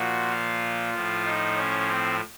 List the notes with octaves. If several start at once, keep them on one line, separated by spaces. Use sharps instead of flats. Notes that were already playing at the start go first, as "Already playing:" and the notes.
Already playing: A#2 F3 F#4
F4
A2 F3
D#4
C#4
C4